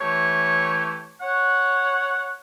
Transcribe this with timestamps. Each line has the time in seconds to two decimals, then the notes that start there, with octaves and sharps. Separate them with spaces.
0.01 E3 A3 G4 C#5
1.22 C#5 F#5